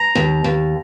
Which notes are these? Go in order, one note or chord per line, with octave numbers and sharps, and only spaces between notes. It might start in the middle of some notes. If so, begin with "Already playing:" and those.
Already playing: A#5
D#2
D#2